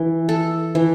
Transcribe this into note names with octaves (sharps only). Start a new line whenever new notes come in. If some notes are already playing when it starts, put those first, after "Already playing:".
Already playing: E3
A4
E3